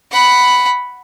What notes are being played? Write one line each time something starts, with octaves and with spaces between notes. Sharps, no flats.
F#5 B5